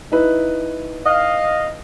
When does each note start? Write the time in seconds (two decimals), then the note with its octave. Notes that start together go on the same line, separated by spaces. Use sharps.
0.12 D#4 E4 B4
1.05 D#5 F5